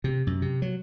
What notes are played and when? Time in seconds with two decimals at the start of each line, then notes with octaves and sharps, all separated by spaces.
0.04 C3
0.27 F#2
0.42 C3
0.62 F#3